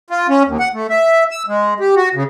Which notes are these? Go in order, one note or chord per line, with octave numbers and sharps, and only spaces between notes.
F4
C#4
D#2
F#5
A3
E5
E6
G#3
G4
F#4
C#3